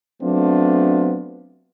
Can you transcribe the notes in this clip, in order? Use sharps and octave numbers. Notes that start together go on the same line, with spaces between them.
F#3 A3 B3 C4 D4 F4